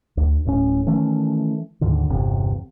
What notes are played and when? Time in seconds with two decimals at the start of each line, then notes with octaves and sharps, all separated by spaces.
0.17 D2
0.45 D1 A2 A#3 C#4
0.87 D#3 E3 A3 C#4
1.81 D2 G#2 D3 D#3
2.10 G1 E2 C3